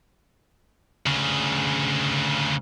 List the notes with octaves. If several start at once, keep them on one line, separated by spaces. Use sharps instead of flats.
D2 C#3